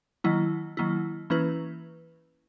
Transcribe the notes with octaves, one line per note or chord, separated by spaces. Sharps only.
D#3 F#3 A#3 E4
D#3 F#3 A#3 E4
E3 A#3 C#4 E4 B4